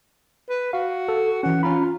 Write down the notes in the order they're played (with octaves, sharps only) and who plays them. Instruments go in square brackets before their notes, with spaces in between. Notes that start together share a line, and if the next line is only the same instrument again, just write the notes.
[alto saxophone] B4
[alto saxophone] F#4 [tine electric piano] F5
[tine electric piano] A4
[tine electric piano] E3 C#4 [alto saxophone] F#5
[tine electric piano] C#4 A#5 B5 [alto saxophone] F4